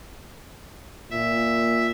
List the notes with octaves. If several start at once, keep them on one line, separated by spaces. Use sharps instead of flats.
A#2 E5